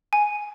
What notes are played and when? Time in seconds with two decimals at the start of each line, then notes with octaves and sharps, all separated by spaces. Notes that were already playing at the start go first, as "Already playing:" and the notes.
0.13 G#5